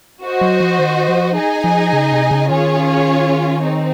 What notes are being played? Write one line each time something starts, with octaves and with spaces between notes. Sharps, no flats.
F#4 C5 D#5
F#3
F3
D#3
F3
D#4 G#4 D#5 G#5
F3
C#3
C3
C#3
D#3 C#4 F4 G#4 C#5
C4 D#4